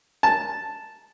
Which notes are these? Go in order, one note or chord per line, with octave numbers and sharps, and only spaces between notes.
A5